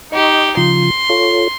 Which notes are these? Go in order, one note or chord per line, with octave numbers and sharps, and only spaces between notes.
D#4 G4 D#5 C#6
C#3 F3 F4 C6
F4 A4 C#5